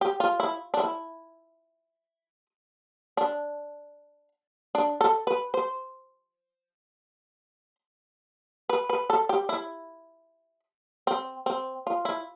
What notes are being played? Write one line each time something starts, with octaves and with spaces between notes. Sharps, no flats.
G4
F4
E4
D4
E4
D4
D4
A4
B4
C5
B4
B4
A4
G4
E4
C4
C4
F4
E4